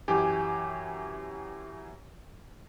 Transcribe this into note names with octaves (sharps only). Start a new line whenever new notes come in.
F#2 E3 G4 G#5